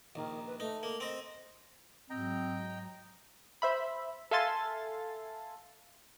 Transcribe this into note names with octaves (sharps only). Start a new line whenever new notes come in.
A#1 D#3
B4
A3 D#4
A#3
C4 D#5
G#2 F#3 C4 D#5 G5 A#5
C5 E5 B5
A4 E5 F5 G#5 C6 A6